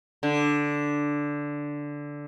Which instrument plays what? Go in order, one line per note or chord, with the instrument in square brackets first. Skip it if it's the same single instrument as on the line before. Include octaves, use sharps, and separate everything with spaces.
[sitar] D3